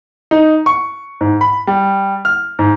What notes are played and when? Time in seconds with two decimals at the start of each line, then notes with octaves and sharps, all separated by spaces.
0.31 D#4
0.66 C#6
1.21 G#2
1.41 B5
1.67 G3
2.25 F6
2.59 G#2